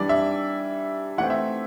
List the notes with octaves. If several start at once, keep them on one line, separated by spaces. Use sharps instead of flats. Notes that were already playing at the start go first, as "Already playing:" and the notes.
Already playing: E3 G3 D4 D5
E5
E3 A3 C4 F#5
E5